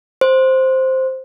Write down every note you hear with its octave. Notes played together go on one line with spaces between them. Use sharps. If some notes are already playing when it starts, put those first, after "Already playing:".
C5